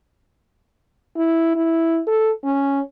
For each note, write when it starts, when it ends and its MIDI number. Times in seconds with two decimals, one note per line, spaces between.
1.16 1.51 64
1.56 2.00 64
2.07 2.30 69
2.44 2.80 61